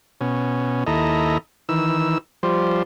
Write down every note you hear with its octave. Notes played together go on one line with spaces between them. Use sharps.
B2 C#4
D#2 E4 A4 D#5 A#5
D#3 E3 E6
F3 G3 C5